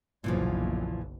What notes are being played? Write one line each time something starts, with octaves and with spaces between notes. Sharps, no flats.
F#1 B1 A#2 E3 F3